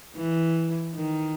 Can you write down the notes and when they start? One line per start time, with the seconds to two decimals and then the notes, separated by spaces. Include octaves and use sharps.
0.16 E3
0.95 D#3